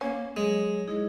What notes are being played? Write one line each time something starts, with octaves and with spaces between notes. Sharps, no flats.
A#3 C#4
F#3 G#3 G#4 C#5
G#3 D#4 E4 G#4